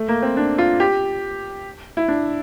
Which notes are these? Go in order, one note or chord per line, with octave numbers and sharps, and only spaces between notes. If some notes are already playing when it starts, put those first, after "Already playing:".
Already playing: A3
A#3
C4
D4
F4
G4
E4
D4